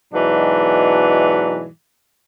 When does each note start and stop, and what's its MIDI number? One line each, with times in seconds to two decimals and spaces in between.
0.13 1.67 44
0.13 1.67 47
0.13 1.67 52
0.13 1.67 54
0.13 1.67 62